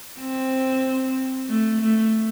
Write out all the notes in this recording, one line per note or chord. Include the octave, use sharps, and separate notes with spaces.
C4
A3
A3